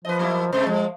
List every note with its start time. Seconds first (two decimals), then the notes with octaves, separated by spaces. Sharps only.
0.05 F3 B4 D#5
0.19 F#3 A#3 E4
0.53 C3 G#3 A3 C5
0.67 F3 G#3